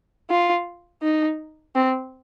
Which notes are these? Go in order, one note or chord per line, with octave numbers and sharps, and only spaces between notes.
F4
D#4
C4